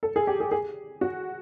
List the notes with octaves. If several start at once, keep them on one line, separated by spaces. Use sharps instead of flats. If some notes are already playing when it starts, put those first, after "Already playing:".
A4
G#4
G4
G#4
G#4
F#4